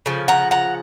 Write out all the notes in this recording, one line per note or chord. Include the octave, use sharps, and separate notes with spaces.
C#3 F3
F#5 A#5
F#5 A#5